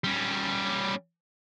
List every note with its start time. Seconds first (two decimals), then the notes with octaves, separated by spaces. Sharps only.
0.04 G3 C#4